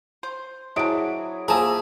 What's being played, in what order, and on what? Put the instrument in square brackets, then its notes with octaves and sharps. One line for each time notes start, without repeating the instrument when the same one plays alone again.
[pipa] C5
[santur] F#3 G#4 [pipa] C4 D4 [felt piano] E4 D7
[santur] F3 A#3 E5 [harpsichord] G#4 [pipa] A5 A#5